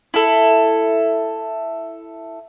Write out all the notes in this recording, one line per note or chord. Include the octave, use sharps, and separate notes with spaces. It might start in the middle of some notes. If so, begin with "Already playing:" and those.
E4 A4